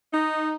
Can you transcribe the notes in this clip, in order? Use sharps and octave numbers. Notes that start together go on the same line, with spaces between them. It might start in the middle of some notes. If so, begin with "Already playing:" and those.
D#4